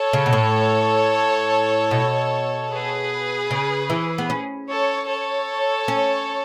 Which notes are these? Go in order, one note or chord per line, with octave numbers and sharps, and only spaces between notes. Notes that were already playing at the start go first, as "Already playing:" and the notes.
Already playing: A4 C#5
C#3
B2
A2
B2
G#4 B4
C#3
E3
B3
C#4
A4 C#5
A4 C#5
C#4